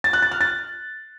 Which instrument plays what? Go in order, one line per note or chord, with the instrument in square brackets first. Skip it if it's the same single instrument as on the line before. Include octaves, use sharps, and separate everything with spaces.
[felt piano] A6
F#6
A6
F6
A6